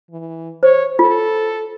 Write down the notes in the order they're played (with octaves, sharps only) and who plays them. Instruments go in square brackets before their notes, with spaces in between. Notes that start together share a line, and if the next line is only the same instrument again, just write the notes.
[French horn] E3
[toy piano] C5 [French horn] C#5
[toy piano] F4 [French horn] A4